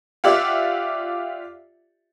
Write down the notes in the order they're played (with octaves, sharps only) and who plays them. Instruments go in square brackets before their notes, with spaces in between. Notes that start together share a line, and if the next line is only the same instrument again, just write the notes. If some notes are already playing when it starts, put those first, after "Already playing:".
[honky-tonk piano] F4 G4 D5 E5 F#5